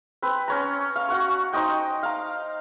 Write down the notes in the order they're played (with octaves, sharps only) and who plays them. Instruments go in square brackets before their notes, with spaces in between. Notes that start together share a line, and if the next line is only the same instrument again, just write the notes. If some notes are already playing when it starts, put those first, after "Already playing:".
[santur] C4 B4
C#4 C#5 A#5
F5
F#4 F#5 C#6
D#4 C5 D#5 G5
F5 A#5